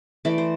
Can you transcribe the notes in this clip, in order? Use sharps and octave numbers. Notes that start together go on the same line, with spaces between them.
E3 A3 D5
C5